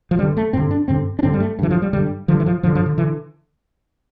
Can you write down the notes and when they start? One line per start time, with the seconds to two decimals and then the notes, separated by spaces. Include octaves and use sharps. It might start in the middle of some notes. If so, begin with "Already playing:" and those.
0.11 F3
0.19 G2 D3 G3
0.37 A3
0.53 G2 D3 C4
0.71 D4
0.88 G2 D3 C4
1.19 D4
1.23 G2 D3 C4
1.33 G3
1.40 A3
1.59 G2 D3 E3
1.71 F3
1.82 G3
1.93 G2 D3 G3
2.28 G2 D3 F3
2.40 E3
2.46 F3
2.63 G2 D3 F3
2.75 F3
2.86 D3
2.98 D3 E3